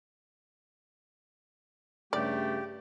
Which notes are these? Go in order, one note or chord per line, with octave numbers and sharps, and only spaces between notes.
G2 C#3 A3 G4 D5